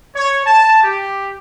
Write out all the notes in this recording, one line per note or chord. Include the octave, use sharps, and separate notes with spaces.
C#5
A5
G4